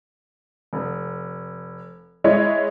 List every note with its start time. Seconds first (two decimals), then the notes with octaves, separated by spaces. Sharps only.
0.73 F1
2.24 G#3 E4 C#5 D#5